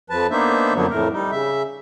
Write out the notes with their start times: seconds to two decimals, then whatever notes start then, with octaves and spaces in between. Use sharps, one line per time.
0.10 F2 F3 B4 A5
0.30 A#3 B3 D4 D#4 C5 E5
0.74 F#2 D3 F3 F#3 A#3 B3
0.90 F2 A2 A3 A#4
1.12 G3 D#4
1.31 C#3 E5